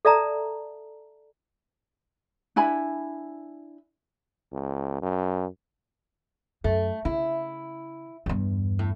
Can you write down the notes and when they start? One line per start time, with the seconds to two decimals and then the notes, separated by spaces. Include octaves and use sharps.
0.05 A4 D5 E5 A5 A#5
2.56 D4 E4 G#5 B5
4.53 C#2
5.02 F#2
6.64 F#2 A3
7.05 C#3 E4
8.26 E2 G2
8.79 A2